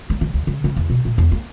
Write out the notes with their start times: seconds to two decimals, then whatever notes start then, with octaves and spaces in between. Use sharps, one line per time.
0.10 A#3
0.21 D3
0.34 D2
0.47 C#3
0.64 C#3
0.76 E2
0.90 B2
1.05 A#2
1.18 E2
1.32 A#3